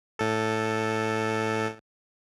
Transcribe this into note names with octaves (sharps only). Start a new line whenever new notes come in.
A2 A4